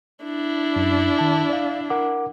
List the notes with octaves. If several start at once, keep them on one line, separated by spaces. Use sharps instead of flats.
D4 E4
F#2
D#3 A5
D5 F5
A#4 F#5 D6